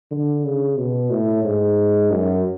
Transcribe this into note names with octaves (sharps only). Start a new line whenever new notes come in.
D3
C#3
B2
A2
G#2
F#2